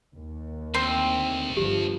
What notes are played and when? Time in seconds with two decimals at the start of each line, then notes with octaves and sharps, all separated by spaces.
0.14 D#2
0.74 D2 C4
1.57 G1 F3 G4